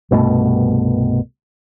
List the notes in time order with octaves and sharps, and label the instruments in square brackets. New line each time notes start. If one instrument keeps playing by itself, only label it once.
[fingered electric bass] C2 G2 B2 A3